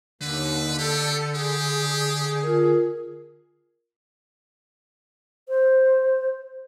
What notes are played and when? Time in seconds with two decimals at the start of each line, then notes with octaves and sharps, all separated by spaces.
0.21 D#2 D3 B4
0.79 G4 A4
1.35 G4 G#4
2.43 F4 A#4
5.49 C5